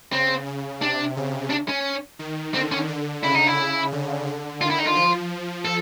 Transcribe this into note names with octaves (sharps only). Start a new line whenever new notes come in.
C#3 C4
C#3
C3 D4
C#3
D4
C#4
D#3
D3 C4
C#4
D3
C#3 E4
D#4
E4
D3
D3
D#3 F4
E4
D#4
F4
F3
A4